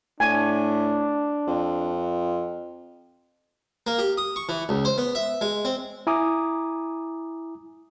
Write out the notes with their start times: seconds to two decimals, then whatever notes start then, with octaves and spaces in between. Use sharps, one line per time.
0.20 A2 D4 G#5
1.47 F2
3.87 A#3
3.99 G4
4.17 D#6
4.36 C#6
4.49 E3
4.69 C#2
4.85 C5
4.98 B3
5.15 E5
5.41 G#3
5.65 C4
6.07 E4 G#5 A#5 D6 D#6